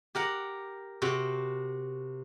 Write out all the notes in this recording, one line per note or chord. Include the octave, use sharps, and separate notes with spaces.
G4 A#4 F#5
C3 F#4 G5